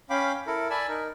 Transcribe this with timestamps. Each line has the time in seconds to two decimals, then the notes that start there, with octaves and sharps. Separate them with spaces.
0.10 C#4 F5 G5 B5 D6
0.47 E4 A4 A#4
0.70 D5 G#5 A5 B5 E6
0.89 D#4 A#4